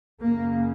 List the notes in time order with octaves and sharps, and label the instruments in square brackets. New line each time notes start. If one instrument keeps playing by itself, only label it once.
[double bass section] F#2 C#3 A#3